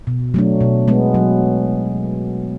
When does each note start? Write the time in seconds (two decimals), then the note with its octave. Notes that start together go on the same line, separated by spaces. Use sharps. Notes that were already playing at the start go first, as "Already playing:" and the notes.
0.07 B2
0.34 F#3 A3 D4
0.61 B2
0.88 G#3 B3
1.14 F#3